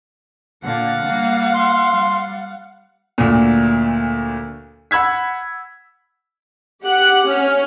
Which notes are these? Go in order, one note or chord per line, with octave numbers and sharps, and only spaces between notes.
A#2 D3 F5 F#5
G3 A#3
C6
G3
D2 A#2
F#5 B5 E6 G#6 B6
G4 F#5 F#6
C#4 F6